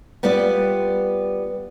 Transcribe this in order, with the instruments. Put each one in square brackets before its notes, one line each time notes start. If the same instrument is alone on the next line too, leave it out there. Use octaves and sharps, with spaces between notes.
[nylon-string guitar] G3 B3 F4 B4 D5